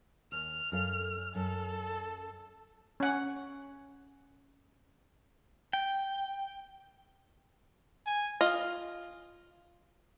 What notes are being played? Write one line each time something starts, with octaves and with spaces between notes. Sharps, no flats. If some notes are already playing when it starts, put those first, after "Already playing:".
D#2 F6
F#2 A4 F5
F#2 A4
C#4 F#5
G5
G#5
F4 D#5